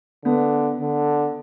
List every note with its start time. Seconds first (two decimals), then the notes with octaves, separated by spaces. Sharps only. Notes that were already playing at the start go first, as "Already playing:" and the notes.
0.25 D3 B3
0.80 D3